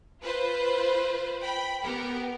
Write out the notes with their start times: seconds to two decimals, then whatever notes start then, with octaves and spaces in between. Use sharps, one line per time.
0.21 F4 B4 C5
1.42 G5 B5
1.84 B3 G4 A#4